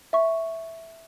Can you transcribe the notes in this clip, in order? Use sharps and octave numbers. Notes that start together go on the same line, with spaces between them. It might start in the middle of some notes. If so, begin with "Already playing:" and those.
E5 C#6